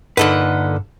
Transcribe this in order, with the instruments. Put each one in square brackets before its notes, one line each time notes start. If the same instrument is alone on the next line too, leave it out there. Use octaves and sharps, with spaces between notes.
[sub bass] G2 [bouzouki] A#2 A4 F#5 [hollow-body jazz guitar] D3 D#4 B4